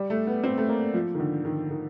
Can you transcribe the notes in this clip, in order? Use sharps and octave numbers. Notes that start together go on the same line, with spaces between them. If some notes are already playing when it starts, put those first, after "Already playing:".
Already playing: G3
A3
B3
C4
A3
A#3
F3
D#3
D3
D#3
D#3